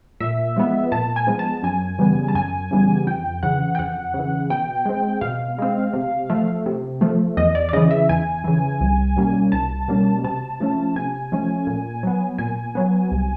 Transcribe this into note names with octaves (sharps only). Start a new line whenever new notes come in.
A#2 E5
F3 G#3 B3
A#2 A5
G#5
F3 G#3 B3
A5
F#2 G#5
C#3 E3 G3 B3
A5
F#2 G#5
C#3 E3 G3 B3
F2 G5
C#3 E3 F#5
G5
F2 F#5
C#3
E3
B2 G5
G#3 C4
B2 F5
G#3 C4
C3
F3 A3
C3
F3 A3
E2 D#5
D5
D5
C#3 E3 D#5
E5
E2 G#5
C#3 E3
C2
B2 G3 A#3 C#4
C2 A5
B2 G3 A#3 C#4
C3 A5
F3 A3 C#4
C3 G#5
F3 A3 C#4
A#2
F#3 B3
A#2 G#5
F#3 B3
C2